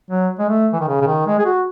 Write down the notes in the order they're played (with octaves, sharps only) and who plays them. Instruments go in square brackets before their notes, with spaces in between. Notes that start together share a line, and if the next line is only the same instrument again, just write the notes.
[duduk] F#3
G#3
A3
E3
D#3
C#3
C#3
D#3
G#3
G#4
F#4